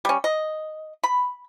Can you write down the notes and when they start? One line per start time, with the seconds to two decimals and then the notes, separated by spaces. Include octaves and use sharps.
0.05 G3 C#4
0.24 D#5
1.04 B5